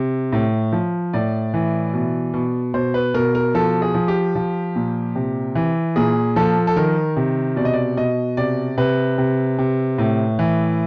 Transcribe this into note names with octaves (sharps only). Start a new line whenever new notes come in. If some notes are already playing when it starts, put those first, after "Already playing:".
Already playing: C3
A2
F3
A2 D5
E3
B2
B2
B2 C5
B4
B2 A#4
A#4
F3 A4
G#4
F3
G4
F3
A#2
C3
E3
A#2 G#4
F3 A4
A4
D#3 A#4
C3
B2 D5
D#5
D5
B2 D#5
C3 D5
C3 B4
C3
C3
A2
E3